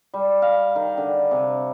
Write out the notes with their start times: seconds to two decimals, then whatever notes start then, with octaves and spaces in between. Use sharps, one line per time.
0.14 G3
0.42 F5
0.76 D#3
0.97 D3
1.31 C3